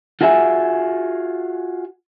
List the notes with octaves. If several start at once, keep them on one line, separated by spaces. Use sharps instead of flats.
F4 F#4 G#4 E5 G#5